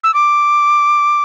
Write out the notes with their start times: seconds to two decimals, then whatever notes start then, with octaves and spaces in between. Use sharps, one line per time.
0.04 E6
0.14 D6